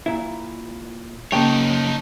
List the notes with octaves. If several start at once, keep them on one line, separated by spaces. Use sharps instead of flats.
A#2 E4
F#2 C#3 A#3 D#4 C#5 G5 A5